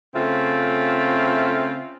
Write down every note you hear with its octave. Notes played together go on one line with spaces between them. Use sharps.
C#3 A3 C4 F4 E5